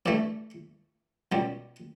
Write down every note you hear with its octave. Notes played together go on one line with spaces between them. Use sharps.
G2 E3 A3 D5
C#2 B2 G3